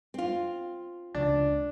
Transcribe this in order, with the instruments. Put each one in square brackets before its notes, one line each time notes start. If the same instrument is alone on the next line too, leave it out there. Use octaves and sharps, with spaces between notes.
[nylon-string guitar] C4 F4
[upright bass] C#2 [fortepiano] D4